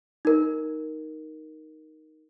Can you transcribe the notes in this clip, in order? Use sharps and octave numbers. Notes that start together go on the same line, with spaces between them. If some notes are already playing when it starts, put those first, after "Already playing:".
D#4 A#4